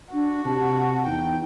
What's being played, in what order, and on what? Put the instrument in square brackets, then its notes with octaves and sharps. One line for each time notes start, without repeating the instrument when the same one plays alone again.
[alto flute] D4 [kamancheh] F#4
[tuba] C3 [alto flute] A5
[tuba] E2 [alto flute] D#4 [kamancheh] G5